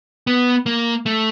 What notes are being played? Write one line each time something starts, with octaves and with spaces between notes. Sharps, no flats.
B3
A#3
A3